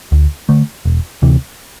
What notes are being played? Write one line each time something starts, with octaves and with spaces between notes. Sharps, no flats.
D2
D3 A3
E1
D2 C3 E3